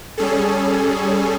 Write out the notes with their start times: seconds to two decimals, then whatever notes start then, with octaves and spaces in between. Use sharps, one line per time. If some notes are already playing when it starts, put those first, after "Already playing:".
0.18 G3 C#4 G#4 A4